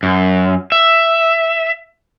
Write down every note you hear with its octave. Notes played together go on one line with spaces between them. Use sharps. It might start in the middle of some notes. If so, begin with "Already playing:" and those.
F#2
E5